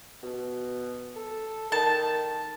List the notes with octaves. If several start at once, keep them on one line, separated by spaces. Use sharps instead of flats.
B2
A4
D#3 A5